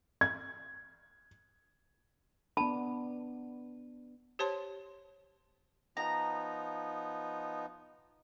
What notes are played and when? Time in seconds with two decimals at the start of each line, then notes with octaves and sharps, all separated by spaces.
0.21 G#6
2.57 B3 D4 A5 B5
4.39 G4 C5 C#5 A5 C6
5.97 F3 B3 D#4 A#5